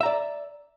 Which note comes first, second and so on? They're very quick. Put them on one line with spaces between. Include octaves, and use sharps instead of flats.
E5 A#5 D5